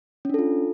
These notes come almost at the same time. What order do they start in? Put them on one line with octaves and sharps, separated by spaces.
C#4 D4 A4 F4